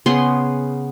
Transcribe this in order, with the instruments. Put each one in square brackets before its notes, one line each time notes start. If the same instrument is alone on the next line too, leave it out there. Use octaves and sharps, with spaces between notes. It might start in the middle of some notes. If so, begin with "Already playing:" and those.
[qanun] C#3 B3 G#4 C6